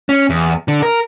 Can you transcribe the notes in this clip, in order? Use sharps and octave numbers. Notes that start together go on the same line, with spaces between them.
C#4
E2
D3
A#4